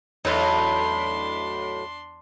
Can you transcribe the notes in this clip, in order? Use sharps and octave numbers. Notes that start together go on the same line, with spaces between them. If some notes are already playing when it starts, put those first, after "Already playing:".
E2 A2 F#3 B3 D4 D#4 A4 C6